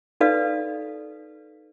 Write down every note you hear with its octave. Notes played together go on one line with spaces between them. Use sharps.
D#4 A4 B4 D5 F5 D#6